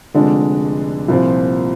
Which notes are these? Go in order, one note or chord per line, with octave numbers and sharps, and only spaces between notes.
F1 F2 D3 G#3 D4
C2 A#2 F3 C4